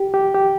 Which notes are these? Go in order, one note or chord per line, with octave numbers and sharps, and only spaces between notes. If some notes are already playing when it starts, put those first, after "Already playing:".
Already playing: G4
G4
G4